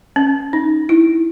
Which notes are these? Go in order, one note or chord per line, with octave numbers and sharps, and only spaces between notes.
C#4
D#4
E4